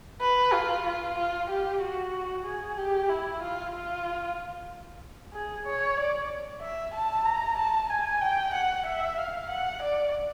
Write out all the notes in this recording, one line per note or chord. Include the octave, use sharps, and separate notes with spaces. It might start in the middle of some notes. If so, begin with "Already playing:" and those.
B4
F4
F4
F4
G4
F#4
G#4
G4
E4
F4
F4
G#4
C#5
D5
E5
A5
A#5
A5
G#5
G5
F#5
E5
F5
F#5
D5